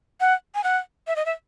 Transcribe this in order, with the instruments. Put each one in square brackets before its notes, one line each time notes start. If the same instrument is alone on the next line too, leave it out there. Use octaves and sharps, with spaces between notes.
[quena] F#5
G#5
F#5
E5
D#5
E5